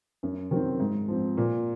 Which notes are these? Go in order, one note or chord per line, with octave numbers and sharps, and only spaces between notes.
F#2
D#3 F#3 C4
G#2
F3 C4
A#2